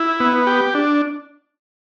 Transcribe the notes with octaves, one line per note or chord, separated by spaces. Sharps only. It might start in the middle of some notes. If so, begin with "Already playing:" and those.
Already playing: E4
B3
G4
D4